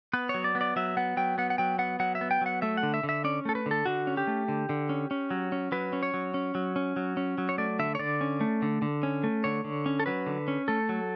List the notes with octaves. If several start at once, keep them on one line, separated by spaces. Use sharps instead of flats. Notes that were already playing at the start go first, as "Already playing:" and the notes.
B3 B4
C#5
F#3
D5
B3
D5
F#3 E5
B3 F#5
F#3 G5
B3 F#5
F#5
F#3 G5
B3 F#5
F#3 F#5
E5
B3
G5
F#3 F#5
A3 E5
F#5
D3
E5
D3
E5
C#4 D5
A3 A4
B4
D3
A4
D3 F#4
C#4
G4
A3
D3
D3
C#4
C#4
F#3
C#4
F#3 B4
C#4
C#5
F#3
C#4
F#3
C#4
F#3
C#4
F#3
C#5
A3 D5
D3 E5
C#5
D3 D5
C#4
A3
D3
D3
C#4
A3
D3 C#5
D3
C#4
A4
F#3 B4
D3
C#4
A3 A4
F#3